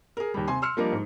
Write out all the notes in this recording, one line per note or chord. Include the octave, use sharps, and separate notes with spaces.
G#4 A#4
D#2 G3
C3 G#5 C6
C6 E6 F6 C#7
F3 G3 A#3 D4 A#4 D#5
G#2